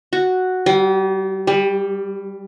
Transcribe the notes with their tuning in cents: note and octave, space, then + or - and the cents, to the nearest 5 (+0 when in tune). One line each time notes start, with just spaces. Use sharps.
F#4 +0
G3 -35
G3 +15